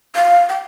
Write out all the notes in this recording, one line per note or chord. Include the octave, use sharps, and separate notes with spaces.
F5
G5